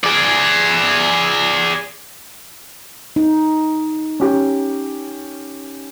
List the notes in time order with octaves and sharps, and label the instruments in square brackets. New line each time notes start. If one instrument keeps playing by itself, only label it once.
[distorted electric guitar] G#4 D5
[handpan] D#4
[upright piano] C#4 G4